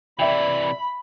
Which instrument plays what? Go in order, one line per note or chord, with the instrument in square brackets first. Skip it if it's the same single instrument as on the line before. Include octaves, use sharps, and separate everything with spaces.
[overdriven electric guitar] C3 E3 [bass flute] D5 [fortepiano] E5 G5 [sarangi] B5